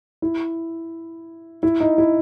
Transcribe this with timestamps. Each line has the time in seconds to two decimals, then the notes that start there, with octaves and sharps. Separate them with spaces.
0.22 E4
1.63 E4
1.80 D#4
1.98 E4